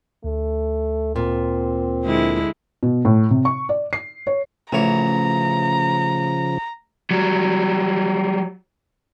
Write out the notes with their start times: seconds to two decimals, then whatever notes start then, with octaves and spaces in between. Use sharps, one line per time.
0.24 D2 A3
1.16 A#2 C4
2.04 D3 G#3 E4
2.83 B2
3.05 A2
3.31 C3
3.45 C#6
3.69 D5
3.93 C7
4.27 C#5
4.73 A1 C#3 E3 F3 C#5 A#5
7.11 F#3 G3